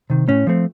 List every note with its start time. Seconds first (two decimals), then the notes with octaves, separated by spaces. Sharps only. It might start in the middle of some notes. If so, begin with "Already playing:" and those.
0.10 C3 D#3
0.28 A2 C#4
0.47 F3 A3 C4